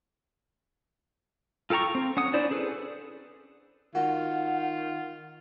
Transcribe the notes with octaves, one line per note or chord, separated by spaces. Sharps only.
F4 A4 G5 A#5 C#6
C4
C#4 F#5 D#6
C#4 D4 E4 C5 D5
G#4 A4 B4 C5
D#3 F4 F#4 F#5